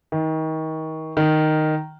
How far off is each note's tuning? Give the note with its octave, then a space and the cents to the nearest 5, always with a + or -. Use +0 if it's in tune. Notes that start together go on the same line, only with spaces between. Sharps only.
D#3 +30
D#3 -5